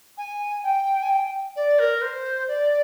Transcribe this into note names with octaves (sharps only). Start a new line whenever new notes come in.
G#5
G5
G#5
G5
D5
A#4
C5
D5